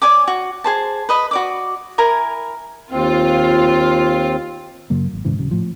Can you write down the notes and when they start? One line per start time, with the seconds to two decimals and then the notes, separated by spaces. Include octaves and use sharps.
0.02 C#5 D5 G#5 D6
0.27 F#4
0.64 G#4 C5 A5
1.09 B4 D#5 B5
1.31 F#4 D5 D6
1.98 E4 A#4 G#5 A#5
2.91 D#2 C4 F4
4.90 F#2 C#3 F#3 A#3
5.13 G#1
5.25 D#1 G#2 C#3 E3
5.37 D#1 C#3 F#3
5.51 A2 F3